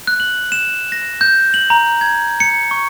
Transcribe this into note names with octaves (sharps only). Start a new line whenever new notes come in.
F#6
F#7
E7
A#6
G6
F#7
A#5
G#6
C#7
C#6